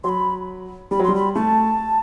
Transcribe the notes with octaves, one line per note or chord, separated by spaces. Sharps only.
F#3 B5 C6
G3 B5
F#3
G3 C6
B5
A3 A5